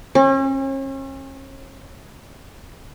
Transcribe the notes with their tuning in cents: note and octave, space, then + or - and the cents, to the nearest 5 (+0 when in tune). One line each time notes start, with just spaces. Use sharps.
C#4 -40